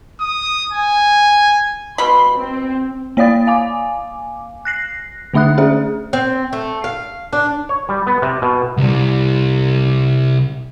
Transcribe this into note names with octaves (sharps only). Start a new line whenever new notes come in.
D#6
G#5
B2 B5 C6
C4
A#3 C#5 D5 F5 D#6 A6
F5 G#5 D6
F#6 A#6 C7
D3 A3 D4 E5 D#6 F#6
C#4 G#4 C5 E5
C4
A3
F5
D4
C#5
G3
B3
C3
B2
C2 G3